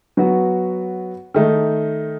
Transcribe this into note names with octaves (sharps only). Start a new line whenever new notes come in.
F#3 B3 F#4
D#3 A3 D#4